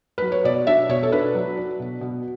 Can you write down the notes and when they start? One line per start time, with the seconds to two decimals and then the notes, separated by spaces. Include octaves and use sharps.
0.18 F#3 B4
0.32 C#5
0.44 B2 D5
0.67 D4 E5
0.89 B2 C#5
1.03 A4
1.12 D4 B4
1.35 F#3
1.57 D4
1.80 B2
2.01 B2